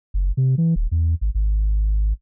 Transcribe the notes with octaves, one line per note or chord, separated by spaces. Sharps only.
F#1
C3
E3
D#1
E2
G#1
G#1